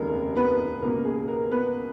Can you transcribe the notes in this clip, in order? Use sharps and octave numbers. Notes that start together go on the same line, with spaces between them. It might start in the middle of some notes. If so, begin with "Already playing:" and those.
Already playing: F1 D#2 C#3 G#3 A#4
B3 B4
C#2 B2 A#3 A#4
G#4
A#4
B3 B4